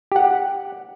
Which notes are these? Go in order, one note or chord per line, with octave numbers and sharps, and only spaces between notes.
G4 F#5